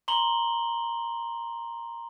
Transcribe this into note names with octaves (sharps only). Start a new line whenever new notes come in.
A#5 C6 F#7 G7